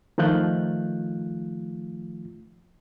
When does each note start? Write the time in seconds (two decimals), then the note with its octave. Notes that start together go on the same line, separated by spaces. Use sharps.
0.18 D#3 F3 A3 F4 F#6 G6